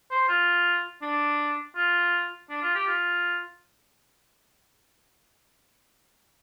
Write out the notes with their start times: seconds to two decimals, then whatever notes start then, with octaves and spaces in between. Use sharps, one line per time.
0.11 C5
0.29 F4
1.02 D4
1.76 F4
2.50 D4
2.62 F4
2.75 G4
2.87 F4